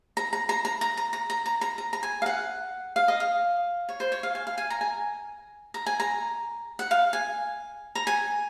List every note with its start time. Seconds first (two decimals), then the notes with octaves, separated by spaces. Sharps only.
0.17 A#5
0.33 A#5
0.49 A#5
0.65 A#5
0.81 A#5
0.97 A#5
1.13 A#5
1.30 A#5
1.46 A#5
1.61 A#5
1.78 A#5
1.93 A#5
2.03 G#5
2.22 F5
2.26 F#5
2.96 F5
3.08 D#5
3.20 F5
3.89 C#5
4.00 C5
4.12 C#5
4.23 F5
4.35 G#5
4.47 F5
4.58 G#5
4.70 A#5
4.81 G#5
5.74 A#5
5.86 G#5
6.00 A#5
6.79 F#5
6.91 F5
7.13 G#5
7.95 A#5
8.07 G#5